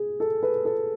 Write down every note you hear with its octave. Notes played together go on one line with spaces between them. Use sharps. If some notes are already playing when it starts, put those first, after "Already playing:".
Already playing: G#4
A4
B4
A4